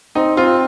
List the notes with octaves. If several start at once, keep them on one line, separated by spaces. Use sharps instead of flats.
C4 D#4
C4 F4